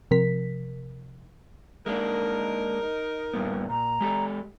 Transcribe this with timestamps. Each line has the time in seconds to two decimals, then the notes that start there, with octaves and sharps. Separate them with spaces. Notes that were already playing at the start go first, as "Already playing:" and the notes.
0.11 C3 F3 A#4 B6
1.86 G#3 A#3 D4 D#4 A#4
3.34 G2 A#2 B3
3.70 A#2 A#5
4.01 G#3 G4 A4